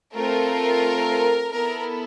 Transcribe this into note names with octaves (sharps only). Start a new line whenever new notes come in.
A3 C4 F4 A4 A#4
B3 E4 A4 A#4